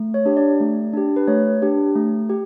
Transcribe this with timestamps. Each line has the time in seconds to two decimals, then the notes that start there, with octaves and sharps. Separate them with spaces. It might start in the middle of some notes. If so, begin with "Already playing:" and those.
Already playing: A3
0.14 C#5
0.25 D4 G4
0.37 D5
0.60 A3
0.93 D4 G4
1.16 B4
1.27 A3 C#5
1.62 D4 G4
1.96 A3
2.30 G4